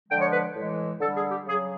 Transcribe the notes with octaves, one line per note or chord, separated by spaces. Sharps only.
D3 F3 G#3 G5
C#5
B4
A2 E3 G#3
D3 G3 A4
G#4
G4
C#3 F#3 G#4